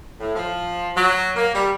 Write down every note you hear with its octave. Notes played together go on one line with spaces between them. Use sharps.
A2
F3
F#3
A#3
G3